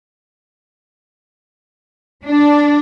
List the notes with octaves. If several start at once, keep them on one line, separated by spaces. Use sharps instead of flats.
D4